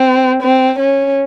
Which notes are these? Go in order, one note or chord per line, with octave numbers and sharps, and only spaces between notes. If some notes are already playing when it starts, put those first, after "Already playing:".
Already playing: C4
C4
C#4